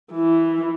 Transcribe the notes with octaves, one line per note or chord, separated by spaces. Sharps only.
E3